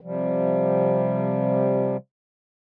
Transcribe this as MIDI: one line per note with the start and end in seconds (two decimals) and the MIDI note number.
0.01 1.97 48
0.01 1.97 53
0.01 1.97 55